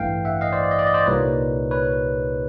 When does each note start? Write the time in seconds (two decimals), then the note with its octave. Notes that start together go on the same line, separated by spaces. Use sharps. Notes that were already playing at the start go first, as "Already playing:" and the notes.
Already playing: A1 G2 E3 A3 F5 G5
0.25 E5 F#5
0.41 D#5 F5
0.52 C5 D5
0.63 D5
0.71 D#5
0.79 D5
0.87 D#5
0.94 C5 D5
1.06 C2 A#2 G3 A#3 D#4 B4 C#5
1.71 B4 C#5